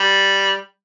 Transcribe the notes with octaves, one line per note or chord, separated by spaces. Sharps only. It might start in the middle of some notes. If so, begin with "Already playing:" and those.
Already playing: G3